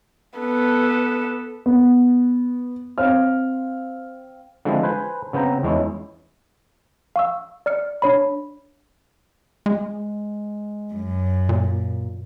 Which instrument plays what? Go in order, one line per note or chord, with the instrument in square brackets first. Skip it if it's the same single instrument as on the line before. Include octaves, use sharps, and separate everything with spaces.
[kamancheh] B3 A4
[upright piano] B3
C4 F5 F6
[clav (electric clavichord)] D3 F3 G#3 C4 E4
B4 C5 G#5
C#3 B3 C4 G5 A#5
E2 G#3 C#4 E4
[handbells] F5 C#6 E6
D5 F6 C#7
D4 C#5 B5
[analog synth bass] G#3
[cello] F#2
[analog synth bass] A#2